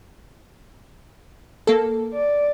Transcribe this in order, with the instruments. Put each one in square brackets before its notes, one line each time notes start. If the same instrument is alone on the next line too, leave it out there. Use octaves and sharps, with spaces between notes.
[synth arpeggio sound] A#3 A4
[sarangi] D5